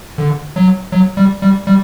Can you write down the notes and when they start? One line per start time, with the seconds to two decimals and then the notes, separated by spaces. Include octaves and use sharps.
0.18 D3
0.56 F#3
0.92 F#3
1.17 G3
1.42 G3
1.67 G3